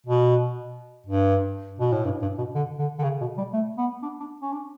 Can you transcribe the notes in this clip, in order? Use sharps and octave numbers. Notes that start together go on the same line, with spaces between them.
B2
G2
B2
A2
G2
G2
B2
D3
D3
D3
C#3
B2
G3
A3
B3
D4
D4
C#4
D4